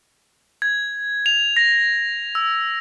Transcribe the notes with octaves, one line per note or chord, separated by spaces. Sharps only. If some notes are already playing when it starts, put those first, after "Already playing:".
G#6
F7
A#6
E6